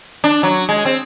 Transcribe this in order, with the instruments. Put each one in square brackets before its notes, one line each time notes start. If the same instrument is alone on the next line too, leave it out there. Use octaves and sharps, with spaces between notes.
[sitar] D4
F#3
G#3
C4